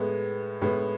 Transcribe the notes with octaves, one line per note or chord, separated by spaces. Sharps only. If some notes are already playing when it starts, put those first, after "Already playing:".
Already playing: A2 G#3 B3
A2 G#3 B3